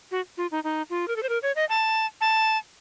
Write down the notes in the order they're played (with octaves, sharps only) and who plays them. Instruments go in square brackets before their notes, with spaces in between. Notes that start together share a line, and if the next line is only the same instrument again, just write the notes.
[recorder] F#4
F4
D#4
D#4
F4
A#4
A4
C5
A#4
C#5
D#5
A5
A5